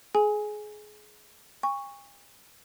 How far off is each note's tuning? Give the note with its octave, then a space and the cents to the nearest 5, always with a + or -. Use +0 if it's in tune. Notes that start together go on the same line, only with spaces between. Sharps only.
G#4 +25 G#5 +0
G#5 -45 C#6 +0